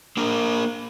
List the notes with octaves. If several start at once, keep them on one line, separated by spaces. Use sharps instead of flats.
A#3 D4 A#4